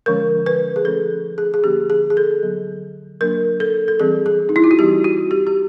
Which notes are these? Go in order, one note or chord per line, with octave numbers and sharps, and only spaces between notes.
D3 F3 G#3 C#4 A#4
B4
G#4
F3 A3 C#4 A4
G#4
G#4
D3 F3 A#3 C#4 G4
G#4
G#4
A4
D3 F#3 B3
F#3 A#3 D4 A#4
A4
A4
E3 G3 C4 G#4
G#4
D#4
E4
F4
F#4
E3 G3 C4 G4
F#4
G4
G4